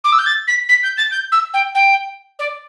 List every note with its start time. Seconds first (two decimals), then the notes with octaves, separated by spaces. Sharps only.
0.04 D6
0.12 E6
0.18 G6
0.26 A6
0.47 B6
0.68 B6
0.83 G6
0.97 A6
1.11 G6
1.32 E6
1.53 G5
1.74 G5
2.39 D5